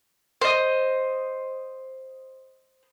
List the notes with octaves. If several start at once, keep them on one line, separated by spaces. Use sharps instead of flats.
C5 D#5